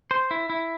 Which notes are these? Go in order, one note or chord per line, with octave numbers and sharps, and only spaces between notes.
C5
E4
E4